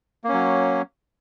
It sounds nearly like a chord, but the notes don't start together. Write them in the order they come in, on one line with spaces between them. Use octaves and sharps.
A#3 C#4 F#3